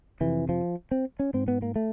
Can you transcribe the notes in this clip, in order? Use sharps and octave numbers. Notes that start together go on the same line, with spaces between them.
F2 C3 E3
F3
C4
C#4
G#2 C4
B3
A#3
A3